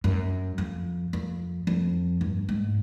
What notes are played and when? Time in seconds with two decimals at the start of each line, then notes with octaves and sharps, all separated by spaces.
0.04 F#2
0.58 F2
1.13 F2
1.67 F2
2.21 G2
2.49 G#2